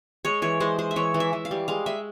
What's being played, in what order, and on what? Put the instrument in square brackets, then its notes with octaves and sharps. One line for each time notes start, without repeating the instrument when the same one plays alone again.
[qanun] G#3 C#5
E3 C#5
G#3 C5
G#3 C5
E5
E3 C#5
E3
E5
E3
F5
G3
G#3 F5
G#3 E5